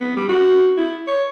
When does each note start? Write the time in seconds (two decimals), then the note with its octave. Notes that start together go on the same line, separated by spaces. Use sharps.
0.01 B3
0.16 G3
0.29 F#4
0.77 E4
1.07 C#5